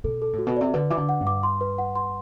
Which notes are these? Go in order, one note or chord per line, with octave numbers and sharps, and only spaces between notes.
B2 A4
A4
A2
F#4
B2
C3 D5
D3 B4
E3 D6
D3
F#5
G2
D6
C6
B4
F#5
C6